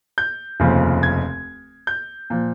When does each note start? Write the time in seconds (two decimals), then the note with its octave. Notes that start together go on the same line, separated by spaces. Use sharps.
0.18 G6
0.60 F1 D#2 C#3 F3
1.03 G#6
1.87 G6
2.30 A#2 F3